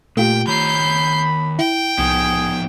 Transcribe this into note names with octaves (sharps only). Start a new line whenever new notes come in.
A#2 A3 F4 G4 G5
D#3 C#5 A#5 B5 G6 C7
E4 G5
C2 F3 B3 D#4 G#4